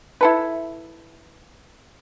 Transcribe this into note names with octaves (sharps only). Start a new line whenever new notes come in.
E4 A4 B4